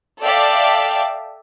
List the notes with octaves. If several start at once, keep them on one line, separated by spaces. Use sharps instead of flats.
A4 D5 E5 F5 G5